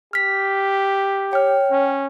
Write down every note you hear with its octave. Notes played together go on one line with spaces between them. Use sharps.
G4 F6 B6
C#5 G5 F6
C#4